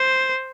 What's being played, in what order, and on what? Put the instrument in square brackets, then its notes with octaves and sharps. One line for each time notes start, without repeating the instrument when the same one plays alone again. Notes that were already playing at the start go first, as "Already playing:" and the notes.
Already playing: [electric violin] C5